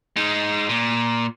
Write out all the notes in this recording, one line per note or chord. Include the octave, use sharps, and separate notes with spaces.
G#3 D#4
A#2